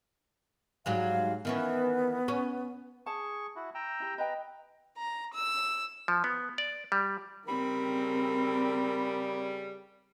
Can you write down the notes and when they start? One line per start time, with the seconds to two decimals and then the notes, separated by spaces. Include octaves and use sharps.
0.86 G#2 F#3 G3 F5
1.45 D#3 E3 B3 C#4
2.28 C#4
3.06 G#4 A5 C#6
3.56 E4 F#4
3.75 G5 A#5 E6
4.00 E4 G4
4.18 B4 D#5 G5 A#5
4.97 A#5
5.33 E6
6.08 F3
6.24 B3
6.58 D5
6.92 G3
7.48 C#3 G3 C4 A#4 B5